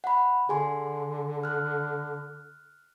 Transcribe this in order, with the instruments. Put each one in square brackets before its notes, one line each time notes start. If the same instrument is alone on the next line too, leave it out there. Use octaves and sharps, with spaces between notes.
[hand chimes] F#5 B5
[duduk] D3 [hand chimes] G#4 G#5 C6
[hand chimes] F6 F#6